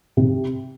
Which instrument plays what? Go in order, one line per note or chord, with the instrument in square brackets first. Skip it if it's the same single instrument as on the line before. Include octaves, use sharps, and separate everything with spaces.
[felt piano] C3